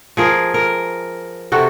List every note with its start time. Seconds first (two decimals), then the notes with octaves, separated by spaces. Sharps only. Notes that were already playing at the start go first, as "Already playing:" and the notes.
0.17 F3 G#4 A#4
0.54 A#4
1.52 C3 F#4 A4